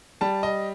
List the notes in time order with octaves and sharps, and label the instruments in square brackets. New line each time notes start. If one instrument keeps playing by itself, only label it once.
[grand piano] G3 A5
D#5